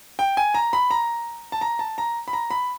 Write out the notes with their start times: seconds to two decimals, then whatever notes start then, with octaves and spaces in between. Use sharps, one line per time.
0.19 G5
0.37 G#5
0.54 A#5
0.73 B5
0.91 A#5
1.52 A5
1.61 A#5
1.79 A5
1.98 A#5
2.28 B5
2.33 A#5
2.50 B5